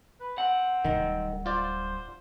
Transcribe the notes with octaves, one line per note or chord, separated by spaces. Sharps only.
B4
C4 F#5
D1 D#3 G3
F4 C5 D5